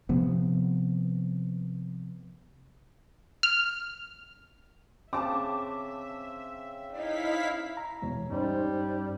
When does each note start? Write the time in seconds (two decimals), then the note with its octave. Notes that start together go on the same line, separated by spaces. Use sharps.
0.09 C3 F3 B3
3.43 F6
5.13 C#3 C4 E5 A5 D6
6.92 D#4 E4 F5 B6
7.77 A#5
8.02 D#2 B2 E3 G#3 C#5
8.30 G2 G3 C#4 D#4 C5